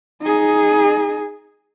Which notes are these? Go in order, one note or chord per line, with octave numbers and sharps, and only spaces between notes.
D#4 G#4